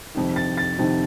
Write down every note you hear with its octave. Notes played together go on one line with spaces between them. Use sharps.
F2 C3 D#3
A6
A6
F2 C3 D#3